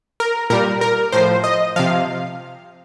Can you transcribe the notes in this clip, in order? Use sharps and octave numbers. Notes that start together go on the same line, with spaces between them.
A#4
A#2 G3 A#4
A#4
A2 F3 C5
D#5
C3 F3 F5